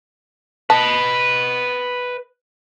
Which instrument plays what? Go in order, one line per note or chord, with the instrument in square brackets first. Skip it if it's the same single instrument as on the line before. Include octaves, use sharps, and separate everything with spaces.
[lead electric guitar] B4 D#5 [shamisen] A5